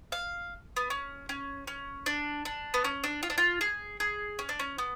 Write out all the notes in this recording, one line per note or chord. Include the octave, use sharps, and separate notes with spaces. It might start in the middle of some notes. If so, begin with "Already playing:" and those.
F5
B3
C#4
C#4
C#4
D4
D4
B3
C#4
D4
F4
D4
F4
G#4
G#4
C#4
D4
C#4
B3